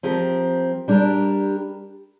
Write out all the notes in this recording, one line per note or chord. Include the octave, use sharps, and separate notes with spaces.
F3 C4 G4 A#4
G3 D4 G4 A#4